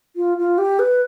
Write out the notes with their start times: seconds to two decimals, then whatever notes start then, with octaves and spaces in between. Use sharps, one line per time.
0.16 F4
0.38 F4
0.58 G4
0.79 B4